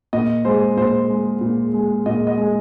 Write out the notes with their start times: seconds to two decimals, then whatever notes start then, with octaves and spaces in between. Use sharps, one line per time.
0.13 A#2 D#5
0.45 G#3 C5
0.77 A#2 C5
1.10 G#3
1.41 A#2
1.74 G#3
2.06 A#2 D#5
2.27 D#5
2.38 G#3